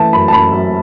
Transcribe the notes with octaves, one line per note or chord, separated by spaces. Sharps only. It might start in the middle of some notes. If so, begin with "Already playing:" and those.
Already playing: E3 A3 A5
F#2 B5
A5
F#2 B5
F#2